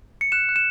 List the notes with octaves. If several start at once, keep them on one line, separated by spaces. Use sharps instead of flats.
C#7
F#6 E7
F#6
E7